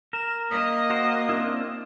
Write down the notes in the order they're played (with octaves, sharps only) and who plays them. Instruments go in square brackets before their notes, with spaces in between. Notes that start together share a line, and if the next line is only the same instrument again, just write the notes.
[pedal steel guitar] A#4 [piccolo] E7
[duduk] A#3 [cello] D#5 [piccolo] D#6
[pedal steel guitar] F#4 A#4 C5
C4 D4 E4